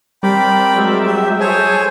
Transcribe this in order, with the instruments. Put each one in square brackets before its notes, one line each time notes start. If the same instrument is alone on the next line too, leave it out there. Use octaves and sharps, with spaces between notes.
[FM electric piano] G3 [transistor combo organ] C4 A#4 D5 [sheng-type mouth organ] G5 B5
[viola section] F#3 G#3 E5
[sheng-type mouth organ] G4
[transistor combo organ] G#4 A4 G#5 [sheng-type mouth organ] C5 C#5